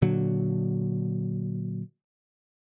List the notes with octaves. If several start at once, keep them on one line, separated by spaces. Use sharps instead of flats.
A#2 D3 F#3